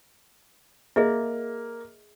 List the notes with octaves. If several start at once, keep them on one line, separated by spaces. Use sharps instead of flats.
A#3 G#4 D#5 E5